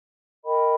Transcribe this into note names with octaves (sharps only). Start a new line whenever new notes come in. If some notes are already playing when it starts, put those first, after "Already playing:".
A#4 D#5 G5 B5